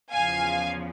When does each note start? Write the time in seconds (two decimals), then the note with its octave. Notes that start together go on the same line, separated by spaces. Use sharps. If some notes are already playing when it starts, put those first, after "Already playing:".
0.11 E2 C#3 F3 F5 G#5